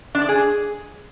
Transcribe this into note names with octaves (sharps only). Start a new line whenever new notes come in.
D4
D5
G#4